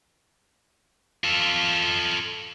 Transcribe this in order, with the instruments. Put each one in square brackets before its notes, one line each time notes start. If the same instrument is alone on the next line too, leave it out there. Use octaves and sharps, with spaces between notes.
[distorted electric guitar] F4 A4